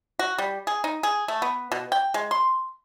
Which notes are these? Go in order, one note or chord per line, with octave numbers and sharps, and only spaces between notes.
F#4
G3
G#4
D#4
G#4
A3
B3
B2
G5
G#3
C6